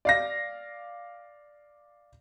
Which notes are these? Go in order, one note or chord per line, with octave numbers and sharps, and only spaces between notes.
D5 F5 A#6